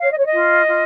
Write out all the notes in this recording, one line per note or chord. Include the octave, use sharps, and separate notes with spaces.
C#5 F5
D#5
C#5
D#5
F4
F4